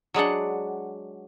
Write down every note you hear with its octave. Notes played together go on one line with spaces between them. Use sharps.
F#3 G#3 D4 F#5